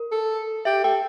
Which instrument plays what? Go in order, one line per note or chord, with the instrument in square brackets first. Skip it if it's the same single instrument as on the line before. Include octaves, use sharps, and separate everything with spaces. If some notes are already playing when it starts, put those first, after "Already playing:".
Already playing: [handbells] A#4
[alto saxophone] A4
[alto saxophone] G4 [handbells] E5
[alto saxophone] A4 [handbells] G5